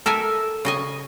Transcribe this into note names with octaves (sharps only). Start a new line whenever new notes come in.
A4 A#4 E5 G#5
C#3 D#5 G#5